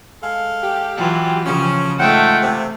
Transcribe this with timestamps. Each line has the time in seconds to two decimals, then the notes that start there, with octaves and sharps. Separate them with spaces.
0.22 G#3 A4 F5
0.63 G4
0.96 E3 F#3 F4
1.45 C#3 F3 C#4
2.00 G#2 G#3 A3 F4 F#5 G5
2.42 C3